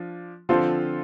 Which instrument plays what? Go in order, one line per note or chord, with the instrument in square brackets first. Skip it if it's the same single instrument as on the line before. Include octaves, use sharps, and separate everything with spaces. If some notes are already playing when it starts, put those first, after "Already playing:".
Already playing: [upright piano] F3 D4 F4
[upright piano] D3 F3 C4 A4 C5 [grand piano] F4